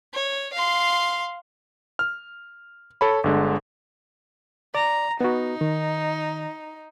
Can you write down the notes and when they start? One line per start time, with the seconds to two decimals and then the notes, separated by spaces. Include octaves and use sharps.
0.14 C#5
0.53 F5 C6
1.99 F6
3.01 A4 C#5 B5
3.24 G1 D3 G#3
4.75 D5 A#5
5.21 B3 D#4 F#4
5.61 D#3